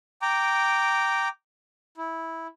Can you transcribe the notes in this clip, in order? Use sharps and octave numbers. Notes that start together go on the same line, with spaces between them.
G5 A#5 D6
E4